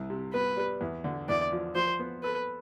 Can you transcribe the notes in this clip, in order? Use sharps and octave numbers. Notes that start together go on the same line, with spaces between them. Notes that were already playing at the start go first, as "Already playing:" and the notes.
Already playing: C2
C3
B3 B4
G3
E2
D3
E2 D5
F3
F3 C5
B3
A4 B4